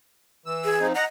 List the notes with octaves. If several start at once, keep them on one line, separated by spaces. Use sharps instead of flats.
E3 E6
G#4
F3 C4 D#4
D#5 F#5 A#5